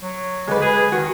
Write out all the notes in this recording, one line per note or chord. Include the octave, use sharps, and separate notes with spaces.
F#3
D3 G#3 B4
G#4
D#3 F#4